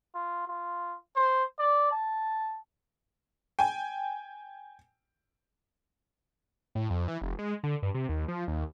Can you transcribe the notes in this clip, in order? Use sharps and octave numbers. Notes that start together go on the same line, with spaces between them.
F4
F4
C5
D5
A5
G5 G#5
A2
F2
E3
F1
G#3
D3
G2
C3
D#2
F3
D#2